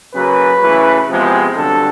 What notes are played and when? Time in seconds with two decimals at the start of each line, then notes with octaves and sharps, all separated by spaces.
0.15 C#3 F#3 A#3 B4
0.62 C#3 E3 A3
1.09 C3 F3 G#3 B3
1.56 G2 D3 F#3 A4